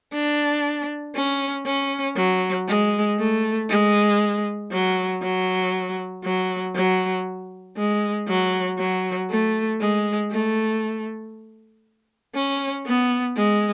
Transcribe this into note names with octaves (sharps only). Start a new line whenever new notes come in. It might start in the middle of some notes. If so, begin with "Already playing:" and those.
D4
C#4
C#4
F#3
G#3
A3
G#3
F#3
F#3
F#3
F#3
G#3
F#3
F#3
A3
G#3
A3
C#4
B3
G#3